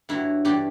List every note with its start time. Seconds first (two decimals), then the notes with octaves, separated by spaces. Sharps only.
0.09 G2 F#3 E4
0.45 G2 E3 G3 G4